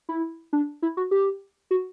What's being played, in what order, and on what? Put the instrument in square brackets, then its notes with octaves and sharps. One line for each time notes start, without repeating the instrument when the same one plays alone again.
[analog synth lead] E4
D4
E4
F#4
G4
F#4